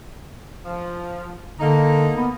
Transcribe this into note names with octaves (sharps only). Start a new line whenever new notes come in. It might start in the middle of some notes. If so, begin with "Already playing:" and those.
F3
D3 A#3 D#4
B3